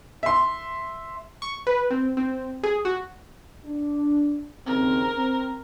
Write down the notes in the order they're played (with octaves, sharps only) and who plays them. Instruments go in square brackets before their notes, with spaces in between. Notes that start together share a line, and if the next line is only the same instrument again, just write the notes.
[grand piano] E5 C6
[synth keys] C#6
B4
C4
C4
G#4
F#4
[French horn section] D4
[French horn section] D#2 C#3 C4 [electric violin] A#4
[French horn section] C4